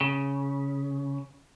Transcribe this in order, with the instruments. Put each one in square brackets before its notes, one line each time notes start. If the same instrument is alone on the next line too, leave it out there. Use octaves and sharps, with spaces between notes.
[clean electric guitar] C#3